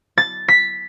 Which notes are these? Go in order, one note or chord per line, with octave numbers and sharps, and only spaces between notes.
A6
B6